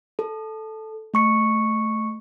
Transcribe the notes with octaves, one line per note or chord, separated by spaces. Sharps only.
A4
A3 C#6 C#7